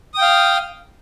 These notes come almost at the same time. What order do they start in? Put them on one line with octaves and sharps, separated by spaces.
D#6 G5 F5